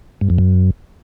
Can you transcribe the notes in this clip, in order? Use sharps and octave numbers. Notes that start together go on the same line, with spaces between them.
G2
F2
F#2